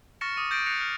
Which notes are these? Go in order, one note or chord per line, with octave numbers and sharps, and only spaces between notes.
C#6 F6 A6 A#6 C#7 E7
D6 D#6 D#7
D#6 G6 A6 A#6 C7 D7
F#6 A#6 C7 C#7 F7
F6